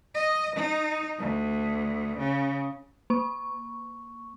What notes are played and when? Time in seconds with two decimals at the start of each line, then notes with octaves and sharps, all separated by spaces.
0.15 D#5
0.56 D#4
1.19 D2
2.18 C#3
3.10 A#3 C#6